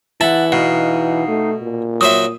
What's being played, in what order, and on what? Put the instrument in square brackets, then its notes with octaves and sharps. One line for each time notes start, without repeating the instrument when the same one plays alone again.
[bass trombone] E3 [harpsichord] E4 [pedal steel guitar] F#5 A5
[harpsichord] B2 [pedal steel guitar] D#4 F5 F#5
[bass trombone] A3
A#2
[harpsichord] F#3 C5 E5 [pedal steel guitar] D#6